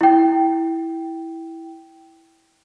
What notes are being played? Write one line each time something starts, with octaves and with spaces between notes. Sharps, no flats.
E4 G5